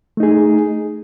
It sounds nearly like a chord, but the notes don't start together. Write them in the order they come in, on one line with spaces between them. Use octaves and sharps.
A3 D#4 G#4